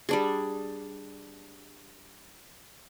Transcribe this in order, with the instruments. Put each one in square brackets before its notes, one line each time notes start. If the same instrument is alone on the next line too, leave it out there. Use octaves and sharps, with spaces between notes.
[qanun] G3 D4 G#4